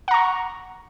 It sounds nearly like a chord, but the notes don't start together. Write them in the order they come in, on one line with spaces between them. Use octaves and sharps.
F#5 A#5 C#6